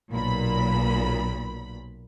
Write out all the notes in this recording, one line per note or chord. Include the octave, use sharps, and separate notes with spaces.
B1 A#2 B5